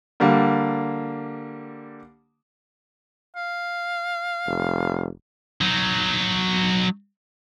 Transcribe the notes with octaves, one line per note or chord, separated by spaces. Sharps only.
D3 G3 A#3
F5
F1
F#3 D#4